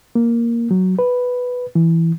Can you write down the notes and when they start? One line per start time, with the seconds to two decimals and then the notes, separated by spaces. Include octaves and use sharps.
0.15 A#3
0.71 F#3
0.99 B4
1.75 E3